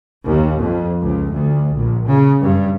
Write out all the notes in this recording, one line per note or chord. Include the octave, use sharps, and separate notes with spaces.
D#2
F2
C#2
D2
A#1
C#3
G2